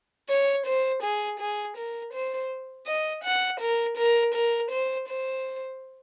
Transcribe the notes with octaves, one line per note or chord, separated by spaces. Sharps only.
C#5
C5
G#4
G#4
A#4
C5
D#5
F#5
A#4
A#4
A#4
C5
C5